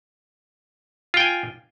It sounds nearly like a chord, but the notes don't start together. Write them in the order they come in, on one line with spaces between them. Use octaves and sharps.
F4 G5 G#5